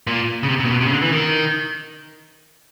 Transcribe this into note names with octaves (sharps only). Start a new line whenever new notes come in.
A#2
C#3
C3
C3
A#2
B2
C3
C#3
D3
E3
D#3